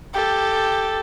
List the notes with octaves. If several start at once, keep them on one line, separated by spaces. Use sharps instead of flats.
G4 A4